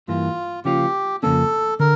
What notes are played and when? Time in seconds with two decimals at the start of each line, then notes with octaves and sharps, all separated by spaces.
0.08 G2 E3 A#3 F4
0.65 C#3 F3 A#3 C#4 F4 G4
1.23 F2 C#3 E3 A#3 C#4 A4
1.80 D3 A#4